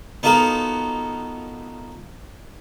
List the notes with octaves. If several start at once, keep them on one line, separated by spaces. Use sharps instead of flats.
B3 D#4 F4 F#4 A4 A#4